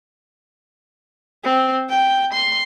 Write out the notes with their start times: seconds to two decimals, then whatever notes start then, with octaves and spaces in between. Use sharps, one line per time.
1.44 C4
1.89 G5
2.34 C6